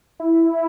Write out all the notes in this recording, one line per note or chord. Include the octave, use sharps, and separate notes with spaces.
E4